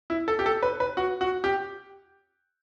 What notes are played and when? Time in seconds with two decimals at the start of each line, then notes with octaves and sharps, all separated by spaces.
0.10 E4
0.28 A4
0.39 G4
0.46 A4
0.62 B4
0.80 B4
0.97 F#4
1.21 F#4
1.44 G4